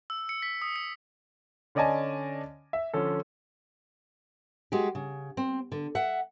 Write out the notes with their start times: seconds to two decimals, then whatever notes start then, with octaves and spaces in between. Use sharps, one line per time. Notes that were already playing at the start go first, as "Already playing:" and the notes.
0.10 E6
0.29 C#7
0.42 B6
0.62 D#6
0.76 C#7
1.75 D3 C#4 D5 D#5 G#5 A5
2.73 E5
2.94 D3 F3 C#4 A4
4.72 G#3 F#4 G4
4.95 C#3
5.37 C4
5.72 D3
5.95 E5 F#5